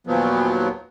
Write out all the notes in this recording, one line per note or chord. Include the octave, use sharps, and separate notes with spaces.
D#2 A#2 F3 F#3 B3